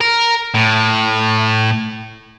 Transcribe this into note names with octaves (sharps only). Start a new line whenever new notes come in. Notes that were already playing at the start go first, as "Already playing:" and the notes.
A#4
A2